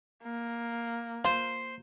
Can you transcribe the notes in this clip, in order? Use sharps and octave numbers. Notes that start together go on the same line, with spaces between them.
A#3
F4 C5